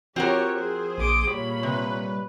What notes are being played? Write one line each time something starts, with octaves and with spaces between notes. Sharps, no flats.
F3 C4 F#4 G4 A#4 C#5
G#4 C5
A#1 C6 D6 D#6
A#2 G3 C#5 B5
C3 B4